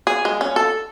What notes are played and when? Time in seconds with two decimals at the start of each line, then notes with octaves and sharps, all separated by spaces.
0.07 G#4
0.25 G#3
0.41 C#4
0.56 A4